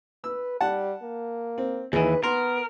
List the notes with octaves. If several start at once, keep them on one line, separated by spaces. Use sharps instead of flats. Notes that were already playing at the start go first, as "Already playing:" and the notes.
B4 E6
G3 F#5 A5
A#3
C4
D#2 E3 D#4 G#4 B4
B3 A#4 C6